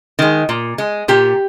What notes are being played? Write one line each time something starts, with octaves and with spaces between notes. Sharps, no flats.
D#3 G#3
A#2
G#3
A#2 G4